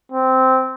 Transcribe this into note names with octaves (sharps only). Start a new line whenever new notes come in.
C4